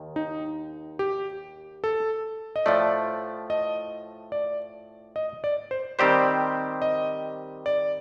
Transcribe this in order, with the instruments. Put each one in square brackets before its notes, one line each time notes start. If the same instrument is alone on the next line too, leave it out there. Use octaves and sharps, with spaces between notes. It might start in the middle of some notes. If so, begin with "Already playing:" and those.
Already playing: [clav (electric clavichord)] D#2 D#3
[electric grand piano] D#4
G4
A4
D#5
[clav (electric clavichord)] A2 F3 A3 [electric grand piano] D5
[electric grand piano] D#5
D5
D#5
D5
C5
[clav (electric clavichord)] D#3 G3 C4 G4 C5 [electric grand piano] D5
[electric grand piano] D#5
D5